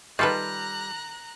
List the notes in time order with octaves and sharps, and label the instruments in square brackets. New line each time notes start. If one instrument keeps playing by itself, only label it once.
[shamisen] D#3 [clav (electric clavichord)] G3 [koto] F4 A4 B4 [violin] A#5 F#6